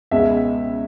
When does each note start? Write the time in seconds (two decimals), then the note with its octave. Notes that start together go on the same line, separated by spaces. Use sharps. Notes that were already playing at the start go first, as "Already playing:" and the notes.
0.11 C#2 B2 G#3 E5